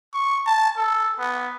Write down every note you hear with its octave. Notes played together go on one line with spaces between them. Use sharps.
C#6
A5
A4
B3